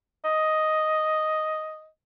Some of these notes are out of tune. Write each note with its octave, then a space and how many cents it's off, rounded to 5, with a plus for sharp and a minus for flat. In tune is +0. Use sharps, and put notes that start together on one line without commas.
D#5 +5